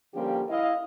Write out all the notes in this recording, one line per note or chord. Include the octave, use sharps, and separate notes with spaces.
D3 F3 G3 A#3 C#4 G4
E4 D#5 F5